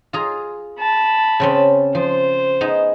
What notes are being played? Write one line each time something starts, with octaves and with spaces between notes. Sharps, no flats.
F4 G#4 A#5
A5 B5
C#3 C4 C#4
F3 C5
B3 D#4 G#4